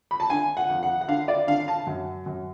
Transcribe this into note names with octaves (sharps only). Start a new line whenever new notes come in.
B5
A5
D3 G#5
F#5
F2
F#5
F#5
D3 F5
D5
D3 F5
A5
F#2
F#2